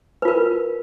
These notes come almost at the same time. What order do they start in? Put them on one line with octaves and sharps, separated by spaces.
B4 F4 A#4